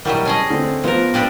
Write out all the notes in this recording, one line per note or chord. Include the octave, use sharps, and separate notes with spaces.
B2 F#3 G3 E4 A#4 F#5
C#4 G#4 D#5 A5
D3 C4
F3 B3 F4 A#4 B4
G3 B3 D4